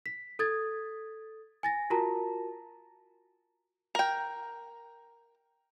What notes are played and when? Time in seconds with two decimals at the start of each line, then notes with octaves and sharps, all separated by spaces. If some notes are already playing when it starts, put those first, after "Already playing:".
0.06 B6
0.39 A4 D#6 G#6 A6
1.63 G#5 A6 A#6
1.90 F4 F#4 A#4 A5 A#5
3.95 A#4 G5